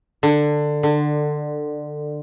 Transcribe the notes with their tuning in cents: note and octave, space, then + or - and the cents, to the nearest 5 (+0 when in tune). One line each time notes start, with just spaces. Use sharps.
D3 +15
D3 +25